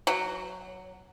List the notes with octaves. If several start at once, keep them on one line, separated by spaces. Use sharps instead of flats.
F#3